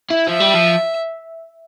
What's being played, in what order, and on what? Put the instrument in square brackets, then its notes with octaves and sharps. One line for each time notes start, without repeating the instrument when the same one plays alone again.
[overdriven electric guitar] E4
[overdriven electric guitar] F3 [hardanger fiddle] E5
[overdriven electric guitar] G3
F3